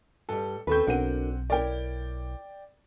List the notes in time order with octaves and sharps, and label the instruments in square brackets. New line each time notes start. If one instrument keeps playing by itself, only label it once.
[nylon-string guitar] G2 G3 [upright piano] A4
[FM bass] D#2 [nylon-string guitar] C4 A4 B4 [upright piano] B5 C#6 G6
[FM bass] B1 [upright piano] C4 F#5 D#7 [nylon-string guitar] D4 F#4 A#4
[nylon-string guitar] E4 A#4 C#5 [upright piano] D5 G5